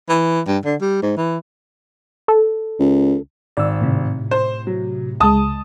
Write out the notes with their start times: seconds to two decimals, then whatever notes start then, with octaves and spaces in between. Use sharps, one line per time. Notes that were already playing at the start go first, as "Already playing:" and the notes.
0.09 E3
0.47 G2
0.65 D3
0.81 G3
1.02 G#2
1.17 E3
2.28 A4
2.79 C#2
3.57 G#1 D5 E6
3.81 A2 C3
4.31 C5
4.67 F#3
5.20 C#2 G#3 A5 D#6